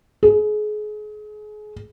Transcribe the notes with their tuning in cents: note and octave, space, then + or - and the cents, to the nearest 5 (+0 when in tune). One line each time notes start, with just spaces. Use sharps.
G#4 +30